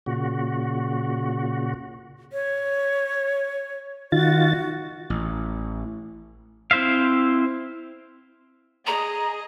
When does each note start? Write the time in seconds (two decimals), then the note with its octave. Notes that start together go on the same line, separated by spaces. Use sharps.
0.06 A#2 C#3 F#4
2.33 C#5
4.12 D#3 F4 F#4 A6
5.10 A1
6.71 C4 E4 C5 E5 F5
8.87 G#4 D#5 A#5